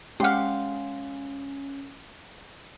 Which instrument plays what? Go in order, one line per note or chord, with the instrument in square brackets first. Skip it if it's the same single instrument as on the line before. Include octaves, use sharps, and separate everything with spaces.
[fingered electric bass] G#3 [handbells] C#4 [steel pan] G4 F#5 [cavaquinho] F5 C6